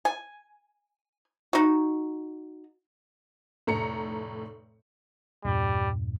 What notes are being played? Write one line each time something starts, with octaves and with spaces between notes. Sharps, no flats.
G#5
D#4 F#4
F1 A2 A4 A#5 C#7
E2 G2 A#2 G3